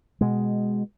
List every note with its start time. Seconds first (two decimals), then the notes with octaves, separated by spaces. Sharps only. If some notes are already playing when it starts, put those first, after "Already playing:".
0.21 B2 G#3